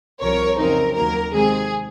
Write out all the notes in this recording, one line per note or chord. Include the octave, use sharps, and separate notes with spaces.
C2 C3 F3 A#4 C#5
F2 C#3 F#3 C4 D#4 A#4
D#2 D#3 F#3 A#3 A#4
C3 D#3 G#3 C4 G#4